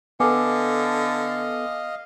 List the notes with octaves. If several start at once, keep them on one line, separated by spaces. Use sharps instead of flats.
D3 B3 A4 D#5 F5 G#5 D6